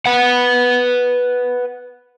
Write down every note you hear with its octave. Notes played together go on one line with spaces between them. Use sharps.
B4 F#5